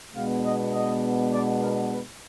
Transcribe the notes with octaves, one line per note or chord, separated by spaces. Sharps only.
B2 G#3 B3 D4 F5
D#5
D#5
D5
A#4
B4